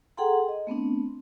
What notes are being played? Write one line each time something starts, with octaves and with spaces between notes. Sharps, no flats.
G#4 A4 F#5 G5 A#5 C6
D#5
A3 B3 C4 D4